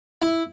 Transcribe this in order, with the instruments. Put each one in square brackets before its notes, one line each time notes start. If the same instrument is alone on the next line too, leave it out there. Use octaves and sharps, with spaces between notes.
[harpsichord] E4